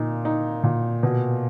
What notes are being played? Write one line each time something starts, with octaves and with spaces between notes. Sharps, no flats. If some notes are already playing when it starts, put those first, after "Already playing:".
Already playing: A#2 D#4
D#4
A#2
B2